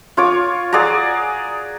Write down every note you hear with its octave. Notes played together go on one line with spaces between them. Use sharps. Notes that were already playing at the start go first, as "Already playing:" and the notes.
F4 C#5 D6
G#4 D5 F#5 A#5